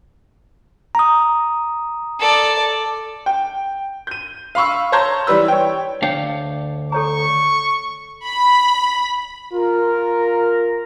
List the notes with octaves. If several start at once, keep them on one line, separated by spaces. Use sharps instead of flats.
A#5 D#6
A4 D5
G5
G6 D#7
F5 B5 C#6 E6
C#5 A5 A#5 C6 G6 G#6
E3 G3 B4 E6
C#5 G5
D2 D4 C#5 F5 G5
A4 C#5 A#5 C#6
B5
F4 A#4